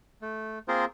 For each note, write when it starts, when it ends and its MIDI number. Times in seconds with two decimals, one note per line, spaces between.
0.22 0.59 57
0.68 0.85 58
0.68 0.85 60
0.68 0.85 65
0.68 0.85 68
0.68 0.85 70
0.68 0.85 72